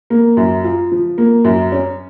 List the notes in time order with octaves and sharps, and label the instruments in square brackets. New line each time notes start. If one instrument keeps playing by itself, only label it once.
[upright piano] A#3
F#2
F4
F3
A#3
F#2
C#4